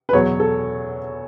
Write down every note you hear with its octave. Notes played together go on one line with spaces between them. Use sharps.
B4
E2 B2 F#3 C#5
A4